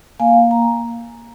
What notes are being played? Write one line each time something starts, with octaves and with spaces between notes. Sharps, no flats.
A#3 F5 G#5
A#5